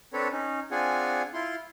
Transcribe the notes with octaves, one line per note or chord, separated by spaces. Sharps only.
C4 D4 A4 B4 C#5
C#4 D#4
C4 D4 F4 G#4 F#5 G#5
E4 F4 C6